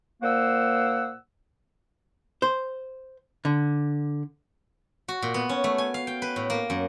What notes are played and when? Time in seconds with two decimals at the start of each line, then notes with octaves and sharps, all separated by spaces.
0.22 A#2 A#3 C5 F#5 E6
2.42 C5
3.45 D3
5.08 F#4
5.22 A#2
5.34 B3
5.49 C#4
5.64 A3
5.78 G#5
5.94 F5
6.07 G5
6.22 B4
6.36 A2
6.50 A#3
6.70 F#2